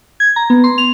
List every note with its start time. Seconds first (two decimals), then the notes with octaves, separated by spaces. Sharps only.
0.20 G#6
0.36 A#5
0.50 B3
0.64 C6
0.78 F7